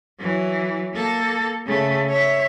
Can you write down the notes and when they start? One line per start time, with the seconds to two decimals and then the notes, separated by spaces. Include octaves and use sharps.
0.19 E3 F#3
0.94 A#3 A4
1.66 C#3 A3
2.08 C#5 E5